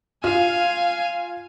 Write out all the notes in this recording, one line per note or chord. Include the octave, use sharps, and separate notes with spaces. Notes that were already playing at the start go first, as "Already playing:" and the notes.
F4 F5 G#5